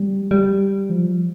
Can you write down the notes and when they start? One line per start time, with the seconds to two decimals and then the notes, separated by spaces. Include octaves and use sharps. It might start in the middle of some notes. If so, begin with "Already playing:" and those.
Already playing: G3
0.31 G3
0.90 F3